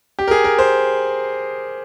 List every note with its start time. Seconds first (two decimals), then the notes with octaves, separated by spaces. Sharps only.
0.19 G4
0.28 A#4
0.31 G#4
0.44 A#4
0.59 C5